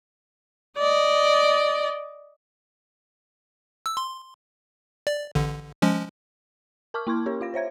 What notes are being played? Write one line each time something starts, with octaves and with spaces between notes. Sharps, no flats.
D5 D#5
E6
C6
D5
A1 D3
F3 G#3 C#4
A#4 A5 C#6 D6 F6
A#3 E4 C6 C#6 G#6
C#4 G4 A#4 C#5
F4 F5 A#6
C5 C#5 E5 G#6